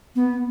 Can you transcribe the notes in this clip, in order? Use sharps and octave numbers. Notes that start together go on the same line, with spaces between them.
B3